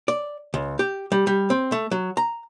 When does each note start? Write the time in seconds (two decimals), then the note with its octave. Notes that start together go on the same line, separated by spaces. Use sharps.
0.08 D5
0.54 C#2
0.79 G4
1.12 G3
1.27 G3
1.50 C4
1.72 A3
1.91 F#3
2.17 A#5